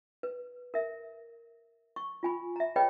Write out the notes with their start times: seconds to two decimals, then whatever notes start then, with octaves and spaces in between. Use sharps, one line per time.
0.23 B4
0.74 A#4 E5
1.96 C#6
2.23 F4 G#5 B5
2.56 E5 A#5
2.76 G#4 B4 C#5 D#5 G5 B5